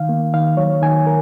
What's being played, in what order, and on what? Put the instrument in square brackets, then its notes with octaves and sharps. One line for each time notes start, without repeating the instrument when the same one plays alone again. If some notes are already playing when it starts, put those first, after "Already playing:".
Already playing: [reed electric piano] D#3 F5
A#3
D#3 F5
F#3 C#5
D#3 G#5
A#4